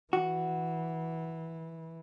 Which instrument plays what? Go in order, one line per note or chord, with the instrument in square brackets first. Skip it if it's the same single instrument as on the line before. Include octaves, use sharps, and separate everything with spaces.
[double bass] E3 [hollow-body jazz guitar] F#4